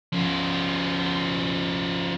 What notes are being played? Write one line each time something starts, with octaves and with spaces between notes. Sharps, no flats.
F3 C#4